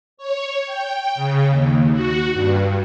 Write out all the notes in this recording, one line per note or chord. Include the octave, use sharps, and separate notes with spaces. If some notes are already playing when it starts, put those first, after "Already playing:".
C#5
G5
C#3
D#2
F#4
G2